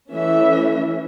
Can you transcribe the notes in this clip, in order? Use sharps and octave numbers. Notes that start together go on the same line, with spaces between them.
E3 A3 C#4 E5